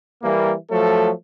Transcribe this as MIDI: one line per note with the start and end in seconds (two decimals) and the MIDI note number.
0.23 0.54 52
0.23 0.54 55
0.23 0.54 58
0.71 1.13 53
0.71 1.13 54
0.71 1.13 57
0.71 1.13 69